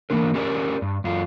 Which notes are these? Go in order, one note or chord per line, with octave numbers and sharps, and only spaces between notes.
E3 A#3 B3 D4 A#4
C#4 G4 G#4 A#4 D5
G2
F#2 F4